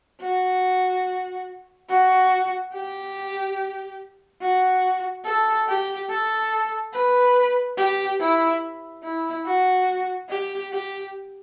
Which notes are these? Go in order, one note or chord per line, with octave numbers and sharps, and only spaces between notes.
F#4
F#4
G4
F#4
A4
G4
A4
B4
G4
E4
E4
F#4
G4
G4